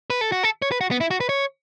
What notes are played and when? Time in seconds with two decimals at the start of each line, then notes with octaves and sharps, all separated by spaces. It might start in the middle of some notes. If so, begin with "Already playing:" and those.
0.10 B4
0.21 A4
0.32 F#4
0.43 A4
0.62 C#5
0.72 B4
0.81 F#4
0.91 B3
1.01 E4
1.11 F#4
1.20 B4
1.29 C#5